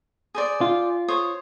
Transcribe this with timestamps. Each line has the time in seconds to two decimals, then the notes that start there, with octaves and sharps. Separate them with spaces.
0.35 G#4 C5 D5
0.61 F4
1.08 C5 C#5 D#6